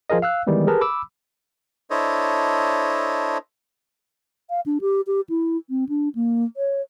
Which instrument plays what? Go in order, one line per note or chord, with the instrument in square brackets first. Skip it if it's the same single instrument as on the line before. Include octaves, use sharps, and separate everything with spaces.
[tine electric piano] F3 F4 G#4 A#4 D#5
F5 E6 F#6
D#3 E3 G3 G#3 B3
G4 G#4 A#4 B4 A5
B5 D6 E6
[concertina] D4 E4 A4 C5 C#5 D#5
[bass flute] F5
D4
G4
G4
E4
C4
D4
A#3
C#5